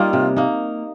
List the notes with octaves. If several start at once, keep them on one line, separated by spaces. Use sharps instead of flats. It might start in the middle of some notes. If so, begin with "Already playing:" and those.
Already playing: G3 A#3 D#4 F4
C3
A#3 D#4